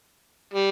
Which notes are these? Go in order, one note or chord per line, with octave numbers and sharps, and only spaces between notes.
G3